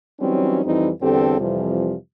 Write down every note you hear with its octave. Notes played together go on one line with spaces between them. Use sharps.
E3 F#3 G3 C4 C#4 D#4
F2 E3 G3 C4 D#4 E4
E2 D3 G3 C4 G4 A4
F2 C3 E3 F3 G3